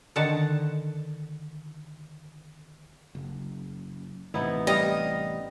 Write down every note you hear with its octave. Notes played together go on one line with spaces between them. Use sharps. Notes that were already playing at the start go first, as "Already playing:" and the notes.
D3 D#3 F#5 A5
F#1
A1 C3 B3 D#4 E4
G3 D#5 F5